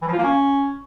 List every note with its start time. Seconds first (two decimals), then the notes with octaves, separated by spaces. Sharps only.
0.02 E3
0.07 F3
0.13 F4
0.18 A#3
0.24 C#4